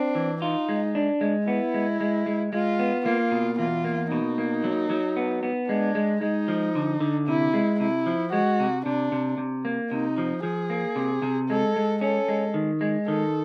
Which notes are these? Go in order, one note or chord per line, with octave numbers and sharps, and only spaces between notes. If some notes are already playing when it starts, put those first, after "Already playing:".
Already playing: C4 D4
E3
D#4 F4
G#3
D4
G#3
B3 E4
G#3
G#3
G#3
G#3 F4
B3
A#3 F4
B2
E2 F4
A#3
B2 D#4
A#3
F#3
F#3
B3
B3
G#3 D4
G#3
G#3 D#4
F3
D3
D3
C3 E4
G#3
C3 E4
F3
G#3 F#4
C3
C3 D4
C3
C3
A#3
C3 D#4
F3
F3 G#4
A#3
C3
C3
G#3 A4
G#3
C#4 A4
G#3
D#3
G#3
D#3 A4